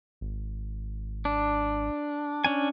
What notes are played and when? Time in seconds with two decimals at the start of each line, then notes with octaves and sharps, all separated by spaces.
0.21 G#1
1.25 D4
2.44 C#4 D4 G#5